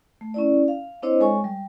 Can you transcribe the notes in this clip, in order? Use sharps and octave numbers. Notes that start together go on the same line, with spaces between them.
A3
C#4 E4 D5
F5
C4 D4 E4 C5 C#5 D#5
G#3 A4 C#5 G#5 C#6
G3